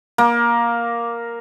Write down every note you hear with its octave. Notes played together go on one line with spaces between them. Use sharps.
A#3